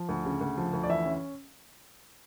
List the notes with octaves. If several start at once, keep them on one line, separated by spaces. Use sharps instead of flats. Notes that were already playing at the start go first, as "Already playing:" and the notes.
Already playing: F3
D2
C#3
D2
F3
D2
D5
E3 E5
C#4